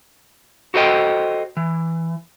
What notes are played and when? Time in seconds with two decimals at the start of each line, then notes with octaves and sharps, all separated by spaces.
0.74 F#4 A4 C5 D#5 G5
1.57 E3